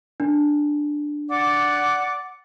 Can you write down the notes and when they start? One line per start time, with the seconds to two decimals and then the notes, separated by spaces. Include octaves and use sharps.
0.20 D4
1.30 D5 F#5 D6